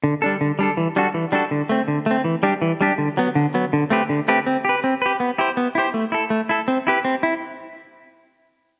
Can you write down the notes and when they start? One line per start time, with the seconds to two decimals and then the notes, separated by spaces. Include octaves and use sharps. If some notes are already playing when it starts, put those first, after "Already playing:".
0.04 D3
0.22 G3 D4 A4
0.41 D3
0.59 G3 D4 A4
0.77 E3
0.96 G3 D4 F#4 A4
1.14 E3
1.32 G3 D4 F#4 A4
1.51 D3
1.69 A3 C4
1.88 D3
2.06 A3 C4
2.24 E3
2.43 G3 D4 G4
2.62 E3
2.81 G3 D4 G4
2.98 D3
3.17 F#3 B3
3.35 D3
3.54 F#3 B3
3.73 D3
3.90 A3 C4 G4 B4
4.09 D3
4.28 A3 C4 G4 B4
4.47 C4
4.65 G4 B4
4.84 C4
5.02 G4 B4
5.20 B3
5.38 E4 G4 C5
5.57 B3
5.75 E4 G4 C5
5.94 A3
6.12 E4 A4
6.30 A3
6.49 E4 A4
6.68 C4
6.87 E4 G4 B4
7.05 C4
7.23 E4